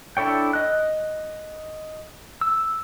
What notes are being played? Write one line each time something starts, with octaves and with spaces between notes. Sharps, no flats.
D4 E4 A4 C#5 G5
D#5 F#6
E6